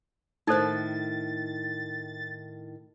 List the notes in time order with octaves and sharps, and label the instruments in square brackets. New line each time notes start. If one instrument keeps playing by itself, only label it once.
[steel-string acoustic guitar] A2 D#3 [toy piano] D#4 A4 C5 [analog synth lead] A6